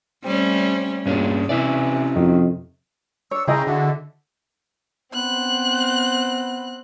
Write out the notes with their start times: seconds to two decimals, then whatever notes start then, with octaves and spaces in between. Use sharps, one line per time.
0.25 G3 A3 C4 C#4
1.06 C#2 G2 A#2 C#4 D4
1.49 C3 E3 C#4 E4 D5
2.16 F2 D#3
3.31 D4 C#5 C#6 E6
3.47 C#3 E4 G#4 C5 D#5 G5 A#5
3.67 D3 F#4 A4 E5
5.14 B3 C4 F#6